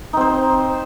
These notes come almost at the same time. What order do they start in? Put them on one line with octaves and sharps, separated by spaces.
D#4 C4 C5